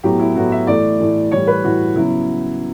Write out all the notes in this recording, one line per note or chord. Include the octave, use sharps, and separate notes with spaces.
A2 F#3 B3 G4
E4
A2 F#3 B3 F#4
E5
A2 E3 A3 D5
A2 E3 A3
A2 E3 G3 C#5
B4
A2 E3 G3 F#4
C#3 F#3 B3 E4